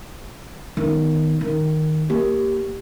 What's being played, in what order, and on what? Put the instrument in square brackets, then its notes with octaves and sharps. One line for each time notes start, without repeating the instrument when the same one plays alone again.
[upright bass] D#3 B3
D#3
[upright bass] A#3 [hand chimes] G4